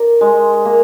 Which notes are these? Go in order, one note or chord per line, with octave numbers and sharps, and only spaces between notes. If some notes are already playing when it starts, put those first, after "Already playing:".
Already playing: A#4 D5
G#3
A#3